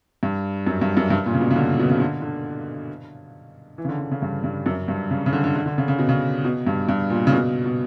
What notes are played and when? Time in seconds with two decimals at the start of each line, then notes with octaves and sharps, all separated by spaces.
0.23 G2
0.67 F#2
0.81 G2
0.97 F#2
1.10 G2
1.26 A#2
1.34 C#3
1.41 B2
1.51 C#3
1.56 D3
1.79 B2
1.90 C#3
2.00 D3
2.22 D3
3.78 E3
3.85 C#3
3.89 D3
3.99 D3
4.11 C#3
4.22 G2
4.44 G2
4.66 F#2
4.88 G2
5.11 C#3
5.26 C#3
5.33 D3
5.44 D3
5.56 D3
5.66 D3
5.78 C#3
5.88 C#3
5.99 B2
6.09 C#3
6.44 B2
6.67 G2
6.89 G2
7.10 A#2
7.27 C#3
7.32 B2
7.66 B2